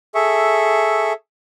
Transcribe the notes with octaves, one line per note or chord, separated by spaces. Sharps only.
G#4 A4 E5 C#6